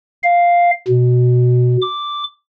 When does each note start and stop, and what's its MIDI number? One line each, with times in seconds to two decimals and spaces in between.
0.23 0.71 77
0.88 1.77 47
1.82 2.24 86